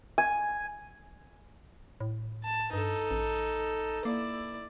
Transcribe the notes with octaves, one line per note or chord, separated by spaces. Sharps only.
G#5
A2
A5
G2 D#4 A4
A1
A#3 E4 D5